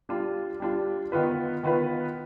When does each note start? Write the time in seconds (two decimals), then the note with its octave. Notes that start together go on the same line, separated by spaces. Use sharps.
0.09 G3 D4 F4
0.60 G3 D4 F4
1.12 D#3 B3 F4 B4
1.63 D#3 B3 F4 B4